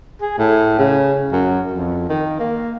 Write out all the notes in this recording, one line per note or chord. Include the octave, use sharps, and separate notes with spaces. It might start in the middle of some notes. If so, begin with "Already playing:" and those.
G#4
A2
C#3
F#2
F2
D#3
A#3